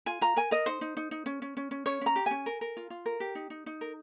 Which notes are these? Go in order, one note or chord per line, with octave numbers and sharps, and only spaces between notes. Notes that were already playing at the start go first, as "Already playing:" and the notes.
F4 G#5
F4 A#5
A#4 G#5
A#4 D#5
D#4 C5
D#4
D#4
D#4
C#4
C#4
C#4
C#4
C#4 C#5
C#4 A#5
G4
C#4 G#5
A#4
A#4
F4
F4
A#4
G4
D#4
D#4
D#4
A#4